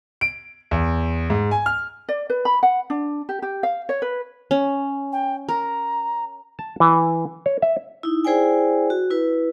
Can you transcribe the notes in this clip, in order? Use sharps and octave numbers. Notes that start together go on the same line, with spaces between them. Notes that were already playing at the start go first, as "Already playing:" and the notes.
D7
E2
G#2
G#5
F6
D5
B4
B5
F#5
D4
G4
G4
F5
C#5
B4
C#4
G5
A#4 A#5
A5
E3
C#5
E5
D#4 E4
E4 G#4 C5 D5 G5 G#5
F#4
E4 B4